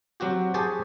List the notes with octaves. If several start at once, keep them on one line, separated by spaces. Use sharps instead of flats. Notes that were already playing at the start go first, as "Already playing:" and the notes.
F#3 C4 F#4 G4
G4 G#4 C5 C#5 G#5 A5